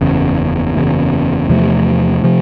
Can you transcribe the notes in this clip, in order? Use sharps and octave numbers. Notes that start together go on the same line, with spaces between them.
F#1 E2 C#3
F#1 E2 C#3
E2 C3 F3 A3
C3 F3 A3